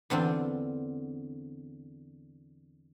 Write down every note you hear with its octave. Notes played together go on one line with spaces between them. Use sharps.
E2 D3 C4 F4